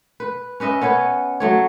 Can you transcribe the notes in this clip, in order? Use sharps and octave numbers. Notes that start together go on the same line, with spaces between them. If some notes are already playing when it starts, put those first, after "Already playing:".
B4
C#4 B4 D#5 E5
B3 C#4 B4 C#5
F#3 A3 C#5